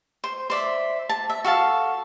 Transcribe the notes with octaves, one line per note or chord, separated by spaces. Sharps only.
C5
C5 D5 E5
A5
E5
F#4 A4 F5 A5